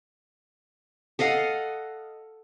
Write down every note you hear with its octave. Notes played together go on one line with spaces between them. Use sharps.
A4 D#5 F5 F#5